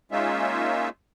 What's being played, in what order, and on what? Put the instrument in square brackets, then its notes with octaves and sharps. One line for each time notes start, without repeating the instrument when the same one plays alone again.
[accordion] G#3 A#3 C#4 D#4 F4 E5